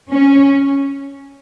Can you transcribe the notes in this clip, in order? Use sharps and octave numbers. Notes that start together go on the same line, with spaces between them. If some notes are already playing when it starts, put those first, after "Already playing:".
C#4